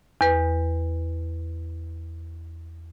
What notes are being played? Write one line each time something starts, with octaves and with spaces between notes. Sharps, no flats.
E2 B4